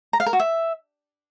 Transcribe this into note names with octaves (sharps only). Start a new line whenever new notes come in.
A#5
F5
A#4
F#4
E5